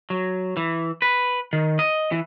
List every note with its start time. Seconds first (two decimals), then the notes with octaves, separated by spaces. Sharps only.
0.10 F#3
0.57 E3
1.02 B4
1.53 D#3
1.79 D#5
2.12 E3